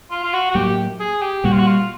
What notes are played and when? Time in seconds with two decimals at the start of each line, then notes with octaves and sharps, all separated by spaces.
0.11 F4
0.23 F4
0.33 F#4
0.51 F#4
0.55 A2 F#3 A#3 G4
1.00 G#4
1.22 G4
1.44 A#2 G3 A#3 F#4
1.52 F4
1.59 F#4
1.67 F4